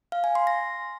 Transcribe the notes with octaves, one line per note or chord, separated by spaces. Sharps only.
F5
G#5
C6
A#6